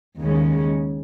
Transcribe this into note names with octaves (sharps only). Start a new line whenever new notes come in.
D#2 C#3 G#3 C#4